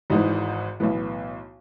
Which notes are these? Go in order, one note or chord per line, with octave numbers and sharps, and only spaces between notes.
G#1 G#2 E3 D#4
B1 A2 E3 B3